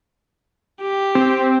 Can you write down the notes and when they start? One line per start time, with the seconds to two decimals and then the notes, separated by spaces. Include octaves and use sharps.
0.81 G4
1.15 C4